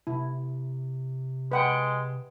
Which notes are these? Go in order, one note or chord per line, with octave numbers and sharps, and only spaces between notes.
C3 E4
G#3 B4 F#5 G5